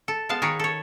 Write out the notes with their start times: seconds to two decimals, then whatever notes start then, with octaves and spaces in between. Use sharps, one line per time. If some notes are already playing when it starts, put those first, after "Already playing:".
0.08 A4
0.29 G#3 B3 F5 A5
0.42 D#3 G#4 A#4 B4 C#5
0.59 A4 C#5